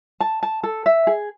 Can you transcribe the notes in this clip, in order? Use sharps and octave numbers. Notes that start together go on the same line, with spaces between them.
A5
A5
A4
E5
G#4